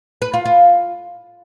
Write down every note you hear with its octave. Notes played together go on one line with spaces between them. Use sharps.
B4
F4
F4